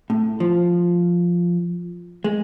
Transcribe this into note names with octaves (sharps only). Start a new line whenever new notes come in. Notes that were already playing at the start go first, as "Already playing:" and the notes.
A2
F3
G#3